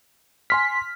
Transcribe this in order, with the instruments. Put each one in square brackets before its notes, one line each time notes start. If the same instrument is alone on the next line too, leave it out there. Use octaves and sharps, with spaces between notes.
[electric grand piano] G#5 C6 F6 [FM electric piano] B6